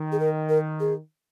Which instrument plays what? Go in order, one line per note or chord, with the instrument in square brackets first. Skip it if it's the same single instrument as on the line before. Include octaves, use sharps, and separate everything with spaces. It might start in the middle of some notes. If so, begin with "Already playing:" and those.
Already playing: [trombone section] D#3
[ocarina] G#4
A#4
A#4
G#4